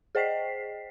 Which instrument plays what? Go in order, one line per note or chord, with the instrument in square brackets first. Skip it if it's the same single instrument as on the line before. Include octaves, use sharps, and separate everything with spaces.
[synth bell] G#4 C5 D#5 G5 B6 C7